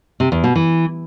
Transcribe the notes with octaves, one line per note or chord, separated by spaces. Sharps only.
C3
E2
B2
E3